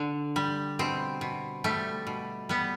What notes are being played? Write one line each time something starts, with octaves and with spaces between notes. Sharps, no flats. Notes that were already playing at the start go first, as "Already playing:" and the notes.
Already playing: D3
G3
B2 C4
B2
G3 A3
B2
G3 B3